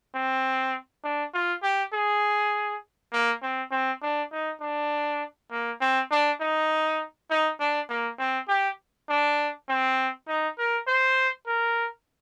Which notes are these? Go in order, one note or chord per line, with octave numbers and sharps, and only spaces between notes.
C4
D4
F4
G4
G#4
A#3
C4
C4
D4
D#4
D4
A#3
C4
D4
D#4
D#4
D4
A#3
C4
G4
D4
C4
D#4
A#4
C5
A#4